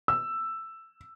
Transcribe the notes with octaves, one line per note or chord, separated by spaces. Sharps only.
E6